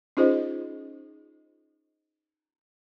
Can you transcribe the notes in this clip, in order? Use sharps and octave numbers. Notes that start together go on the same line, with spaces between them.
C#4 D#4 F4 G#4 C5 D#5